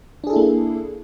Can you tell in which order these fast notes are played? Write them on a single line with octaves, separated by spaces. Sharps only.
D4 G#4 A4 E4 A#3